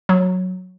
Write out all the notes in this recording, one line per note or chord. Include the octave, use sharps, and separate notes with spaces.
F#3